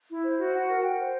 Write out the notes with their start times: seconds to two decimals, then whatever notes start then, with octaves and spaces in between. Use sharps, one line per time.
0.09 E4
0.23 C5
0.38 F#4
0.54 F#5
0.68 A#4
0.83 G5
0.98 C5